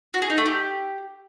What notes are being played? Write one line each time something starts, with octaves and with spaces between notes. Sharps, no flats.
F#4
G#4
D#4
A3
G4